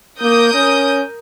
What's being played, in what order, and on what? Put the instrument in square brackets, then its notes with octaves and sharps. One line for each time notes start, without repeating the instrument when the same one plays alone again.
[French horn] A#3 [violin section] A#4 D#6 G6
[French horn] C#4